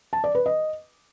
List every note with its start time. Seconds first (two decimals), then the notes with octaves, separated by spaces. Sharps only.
0.13 A5
0.24 D5
0.35 B4
0.46 D#5